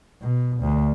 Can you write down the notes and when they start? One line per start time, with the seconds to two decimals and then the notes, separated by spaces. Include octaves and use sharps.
0.22 B2
0.61 D2